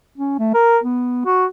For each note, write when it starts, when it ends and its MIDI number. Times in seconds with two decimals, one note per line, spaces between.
0.18 0.34 61
0.39 0.53 57
0.54 0.78 70
0.83 1.24 59
1.25 1.46 66